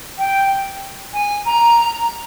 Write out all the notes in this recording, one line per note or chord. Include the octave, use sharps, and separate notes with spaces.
G5
G#5
A#5